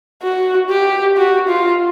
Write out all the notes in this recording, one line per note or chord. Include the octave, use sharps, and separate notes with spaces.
F#4
G4
F#4
F4